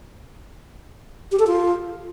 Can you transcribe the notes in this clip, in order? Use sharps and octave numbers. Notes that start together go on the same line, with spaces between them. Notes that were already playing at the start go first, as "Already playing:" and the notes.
G4
A4
F4